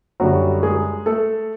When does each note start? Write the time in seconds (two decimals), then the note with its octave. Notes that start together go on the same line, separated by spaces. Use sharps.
0.20 F#2 D3 F#3 G3 F#4
0.63 G#3 G#4
1.06 A3 A4